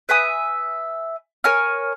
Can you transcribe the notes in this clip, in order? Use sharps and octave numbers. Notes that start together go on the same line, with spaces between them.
B4 E5 G#5 D#6
A#4 C#5 G#5 F6